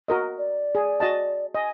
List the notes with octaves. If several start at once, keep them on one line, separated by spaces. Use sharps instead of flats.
F#4 A#4 D#5
D5
G#4
F#4 D#5 A5
D#5 G#5